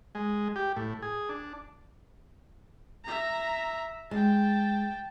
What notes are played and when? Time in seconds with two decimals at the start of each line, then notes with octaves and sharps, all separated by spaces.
0.15 G#3
0.56 G4
0.77 A2
1.02 G#4
1.29 D4
3.04 E5 A#5
4.11 G#3 G5 A5